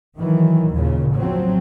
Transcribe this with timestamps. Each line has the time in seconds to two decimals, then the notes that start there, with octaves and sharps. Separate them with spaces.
0.18 D#3 E3 F#3
0.72 D#2 A#2 C#3
1.13 A1 F3 F#3 C4